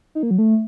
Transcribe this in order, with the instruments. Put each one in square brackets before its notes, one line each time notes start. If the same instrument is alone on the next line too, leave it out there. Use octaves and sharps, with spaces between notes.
[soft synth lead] D#4
A#3
F#3
A3